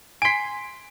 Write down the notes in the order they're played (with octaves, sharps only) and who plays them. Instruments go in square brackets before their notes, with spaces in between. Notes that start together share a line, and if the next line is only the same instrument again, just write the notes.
[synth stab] G#5 C6 [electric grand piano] B6 D7